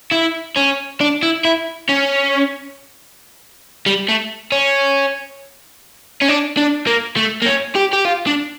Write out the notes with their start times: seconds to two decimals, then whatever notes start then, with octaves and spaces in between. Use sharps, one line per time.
0.11 E4
0.56 C#4
1.01 D4
1.23 E4
1.45 E4
1.89 C#4
3.86 G3
4.09 A3
4.52 C#4
6.22 C#4
6.28 D4
6.57 D4
6.87 A#3
7.17 A3
7.42 A#3
7.46 C#4
7.76 G4
7.93 G4
8.05 F4
8.27 D4